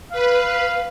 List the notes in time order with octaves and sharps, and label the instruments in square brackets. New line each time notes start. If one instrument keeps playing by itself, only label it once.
[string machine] B4 [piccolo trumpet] F5